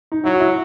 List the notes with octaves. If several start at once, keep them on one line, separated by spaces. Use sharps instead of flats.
D#4
F#3 E4
F#4
E4